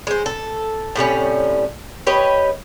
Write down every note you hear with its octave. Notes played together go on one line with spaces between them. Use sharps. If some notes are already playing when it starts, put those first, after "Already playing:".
G#3 C5
A4
A2 C3 G3 C#4
G4 B4 C#5 D#5